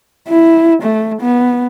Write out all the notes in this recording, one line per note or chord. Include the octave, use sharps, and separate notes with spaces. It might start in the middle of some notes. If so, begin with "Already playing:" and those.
E4
A3
B3